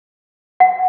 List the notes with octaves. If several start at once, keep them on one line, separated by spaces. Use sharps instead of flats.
F#5